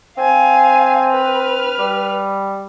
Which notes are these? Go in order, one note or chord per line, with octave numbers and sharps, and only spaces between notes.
C4 F5 G#5
B4 F6
G3